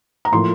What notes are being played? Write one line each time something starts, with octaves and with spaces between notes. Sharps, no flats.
A#5
A2 F3 A#3 C6